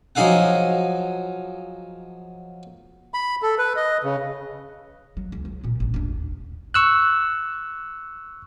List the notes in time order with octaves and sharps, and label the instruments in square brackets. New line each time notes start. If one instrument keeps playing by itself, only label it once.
[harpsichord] F3 F#3 D#4 G#4 F5 F#5
[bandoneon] B5
A4
B4
D#5
C#3
[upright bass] F#3
C#2
F#3
A#2 C#3
A1 D4
D#2 D4
[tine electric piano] C#6 E6 F#6